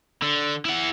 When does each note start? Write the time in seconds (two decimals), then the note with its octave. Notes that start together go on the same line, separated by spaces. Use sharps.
0.22 D3
0.65 E4 F#5